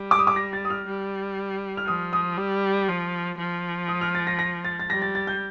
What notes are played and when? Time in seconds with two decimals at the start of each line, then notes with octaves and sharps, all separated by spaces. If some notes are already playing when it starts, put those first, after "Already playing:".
Already playing: G3
0.11 D6
0.19 D#6
0.27 D6
0.36 A#6
0.53 A6
0.65 D#6
0.70 F6
0.87 G3
1.77 F6
1.88 F3 D#6
2.13 D#6
2.38 G3
2.88 F3
3.39 F3
3.88 D#6
4.01 F6
4.15 A6
4.27 A#6
4.39 A#6
4.65 A6
4.80 A6
4.90 G3 A#6
5.02 A6
5.15 A6
5.27 G6